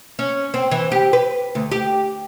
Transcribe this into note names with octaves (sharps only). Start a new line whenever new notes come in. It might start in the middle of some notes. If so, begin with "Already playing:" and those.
C#4
C4
E3
G4
B4
D2
G4